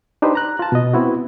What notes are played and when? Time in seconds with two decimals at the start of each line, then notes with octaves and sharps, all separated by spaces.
0.22 D4 D#4 G4 B4 C5
0.35 A#5 F#6
0.59 F4 A5
0.72 B2 D#5
0.93 B3 C4 E4 F#4